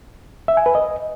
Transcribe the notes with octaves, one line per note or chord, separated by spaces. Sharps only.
E5
G#5
B4
D#5